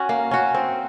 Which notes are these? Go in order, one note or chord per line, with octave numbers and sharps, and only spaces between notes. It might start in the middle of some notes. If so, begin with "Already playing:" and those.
Already playing: C#4 F#4
A#3
C#4 F#4
C4